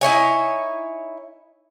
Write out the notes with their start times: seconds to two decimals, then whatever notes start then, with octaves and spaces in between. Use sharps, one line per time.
0.01 D#4 E4 C#5 G#5